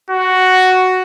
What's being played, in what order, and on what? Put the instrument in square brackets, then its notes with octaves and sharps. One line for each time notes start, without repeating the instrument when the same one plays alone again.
[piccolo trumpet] F#4